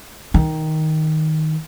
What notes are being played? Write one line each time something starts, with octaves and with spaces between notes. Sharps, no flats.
D#3